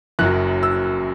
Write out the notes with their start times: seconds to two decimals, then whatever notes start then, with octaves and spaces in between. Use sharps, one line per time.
0.19 F#1 F#2 F#3 F#6
0.63 E6